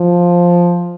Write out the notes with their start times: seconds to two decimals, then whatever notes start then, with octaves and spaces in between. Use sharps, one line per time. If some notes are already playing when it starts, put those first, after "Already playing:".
Already playing: F3